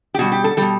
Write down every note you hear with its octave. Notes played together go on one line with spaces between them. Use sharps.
G4
B2 G3 F#4
G4
A4
B2 G3 A4